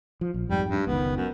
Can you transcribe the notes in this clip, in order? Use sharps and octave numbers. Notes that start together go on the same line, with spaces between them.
F3
A#1
F2 G#2 G3
G2
F#1 C#2 D#3 B3
F#2